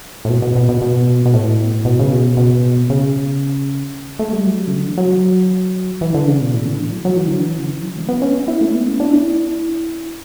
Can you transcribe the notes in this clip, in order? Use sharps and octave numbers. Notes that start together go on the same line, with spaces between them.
A2
B2
B2
B2
B2
B2
B2
A2
B2
C#3
B2
B2
C#3
A3
G3
F#3
C#3
D3
E3
F#3
E3
D3
C#3
B2
A2
D3
E3
F#3
F#3
E3
D3
E3
C#3
E3
F#3
A3
B3
C#4
E4
A3
B3
C#4
D4
E4